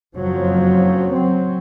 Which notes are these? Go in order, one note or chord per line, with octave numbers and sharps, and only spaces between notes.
F#1 F2 F3 F#3
F#3 C4